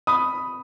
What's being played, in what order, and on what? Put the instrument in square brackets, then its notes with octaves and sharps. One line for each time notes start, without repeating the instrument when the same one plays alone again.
[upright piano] B5 D#6